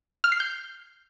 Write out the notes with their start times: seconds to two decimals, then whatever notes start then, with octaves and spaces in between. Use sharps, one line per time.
0.24 F6
0.32 C7
0.40 G6